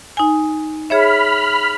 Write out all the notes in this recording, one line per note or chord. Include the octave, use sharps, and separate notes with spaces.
D#4 G#5
G#4 C#5 E5 B5 F6 B6